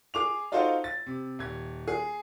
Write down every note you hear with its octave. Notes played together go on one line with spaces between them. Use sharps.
G#4 D6 F7
D#4 F4 F#4 A4 C5 F5
A6
C3
D#1 G#6
G#4